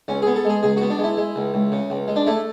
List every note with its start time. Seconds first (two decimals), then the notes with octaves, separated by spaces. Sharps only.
0.08 C#2 C#4
0.22 G#4
0.27 B3
0.36 A4
0.45 G#3 G#4
0.63 C#2 G#4
0.77 B3 F#4
0.90 D4
0.99 G#3
1.04 E4
1.17 G#3
1.36 C#2
1.54 C#2
1.72 C#3
1.90 C#2
2.08 G#3
2.16 D4
2.27 A3 E4